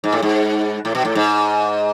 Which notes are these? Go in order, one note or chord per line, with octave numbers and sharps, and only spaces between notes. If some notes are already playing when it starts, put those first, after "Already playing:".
G#2
A2
G#2
A2
B2
A2
G#2